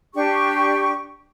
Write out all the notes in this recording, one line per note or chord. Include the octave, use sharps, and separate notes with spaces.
D4 G4 C#6